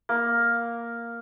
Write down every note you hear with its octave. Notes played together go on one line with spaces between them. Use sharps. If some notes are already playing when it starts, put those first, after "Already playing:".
A#3